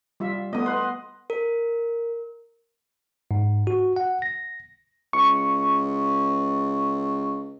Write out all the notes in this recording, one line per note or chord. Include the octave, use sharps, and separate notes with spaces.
G3 F4 E5
A3 B3 D#5 D#6
B4 F#5 C6
A#4
G#2
F#4
F#5
A#6
C#2 C#6